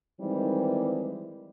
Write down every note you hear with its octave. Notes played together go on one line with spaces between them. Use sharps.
D#3 E3 G3 G#3 C4 D#4